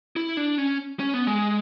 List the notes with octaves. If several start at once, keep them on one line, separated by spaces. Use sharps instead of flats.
E4
D4
C#4
C#4
B3
G#3